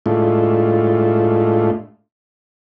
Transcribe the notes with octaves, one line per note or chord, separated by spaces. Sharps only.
A2 G#3 A3 D4 F4